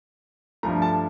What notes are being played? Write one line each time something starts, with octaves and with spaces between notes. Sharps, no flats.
G2 F3 A3 A#5
A5